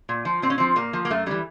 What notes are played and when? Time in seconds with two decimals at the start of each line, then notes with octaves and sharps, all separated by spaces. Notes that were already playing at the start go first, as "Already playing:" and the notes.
0.09 A#2
0.25 F3
0.42 A#2 C4
0.50 C#4
0.58 F3 C4
0.76 A#2 A#3
0.93 F3
1.05 A#3
1.10 F#2 A3
1.26 C#3 E3 G3